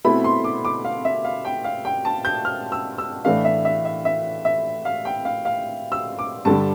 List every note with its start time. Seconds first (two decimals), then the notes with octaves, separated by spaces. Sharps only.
0.04 B2 A3 C4 E4 B5
0.24 C6
0.44 D6
0.65 D6
0.85 F5
1.05 E5
1.25 F5
1.45 G5
1.64 F5
1.85 G5
2.05 A5
2.25 G6
2.45 F6
2.72 E6
2.98 E6
3.25 A2 E3 A3 D4 F5
3.45 E5
3.65 E5
3.85 E5
4.05 E5
4.45 E5
4.85 F5
5.05 G5
5.25 F5
5.45 F5
5.92 E6
6.19 D6
6.45 G2 D3 G3 A5